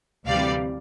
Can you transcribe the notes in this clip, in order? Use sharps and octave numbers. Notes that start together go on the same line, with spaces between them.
D2 C3 E3 G3 D5 F5